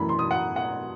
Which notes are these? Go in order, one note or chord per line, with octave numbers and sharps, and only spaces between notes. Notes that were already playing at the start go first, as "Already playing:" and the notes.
Already playing: F#2 E3 A3 B5
C6
D#6
F#5
F#5